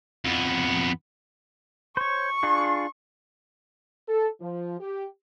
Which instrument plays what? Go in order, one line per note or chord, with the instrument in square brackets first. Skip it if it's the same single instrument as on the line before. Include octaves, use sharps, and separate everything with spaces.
[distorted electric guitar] F2 B3
[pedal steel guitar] C5 C#5 [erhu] C#6
[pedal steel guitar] D4 F4 G#4
[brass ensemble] A4
F3
G4